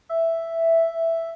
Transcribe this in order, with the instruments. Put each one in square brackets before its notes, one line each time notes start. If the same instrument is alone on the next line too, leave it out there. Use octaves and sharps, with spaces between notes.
[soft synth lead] E5